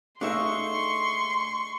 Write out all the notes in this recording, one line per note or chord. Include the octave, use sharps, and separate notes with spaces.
A3 D4 D#4 G#4 E5 F5 C6 C#6